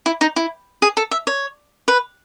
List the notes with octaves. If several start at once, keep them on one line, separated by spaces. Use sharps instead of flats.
E4
D#4
E4
G#4
A4
E5
C#5
B4